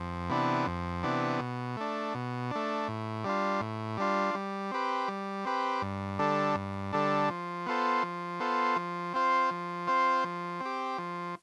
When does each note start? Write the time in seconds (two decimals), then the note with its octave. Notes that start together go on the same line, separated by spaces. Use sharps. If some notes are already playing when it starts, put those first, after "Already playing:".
Already playing: F2
0.30 C3 E3 B3 D4
0.67 F2
1.03 C3 E3 B3 D4
1.40 B2
1.77 A3 D4
2.14 B2
2.51 A3 D4
2.88 A2
3.24 G3 D4 F4
3.61 A2
3.97 G3 D4 F4
4.34 G3
4.71 C4 G4 B4
5.08 G3
5.45 C4 G4 B4
5.82 G2
6.19 D3 G3 D4 A4
6.55 G2
6.93 D3 G3 D4 A4
7.30 F3
7.66 B3 F4 A4 C5
8.03 F3
8.40 B3 F4 A4 C5
8.76 F3
9.14 C4 F4 C5
9.51 F3
9.87 C4 F4 C5
10.24 F3
10.60 C4
10.65 G4
10.98 F3